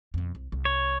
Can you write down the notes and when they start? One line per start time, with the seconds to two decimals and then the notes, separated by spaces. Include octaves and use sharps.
0.14 F2 B2
0.35 C2
0.52 C2
0.65 C#5